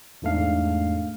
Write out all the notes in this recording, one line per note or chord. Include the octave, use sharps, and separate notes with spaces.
E2 G#2 A3 D4 F5